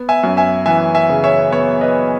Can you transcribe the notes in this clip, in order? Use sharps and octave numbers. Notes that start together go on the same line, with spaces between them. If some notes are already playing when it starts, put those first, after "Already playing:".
Already playing: B3
E5 G#5
F#2
E5 G#5
E3 E5 G#5
E5 G#5
C#3
C#5 E5
B3 C#5 E5
B4 D#5